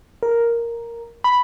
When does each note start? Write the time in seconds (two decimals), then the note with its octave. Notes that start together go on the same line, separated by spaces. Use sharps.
0.23 A#4
1.24 B5